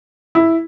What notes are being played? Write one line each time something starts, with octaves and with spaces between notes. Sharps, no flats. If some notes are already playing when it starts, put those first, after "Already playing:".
E4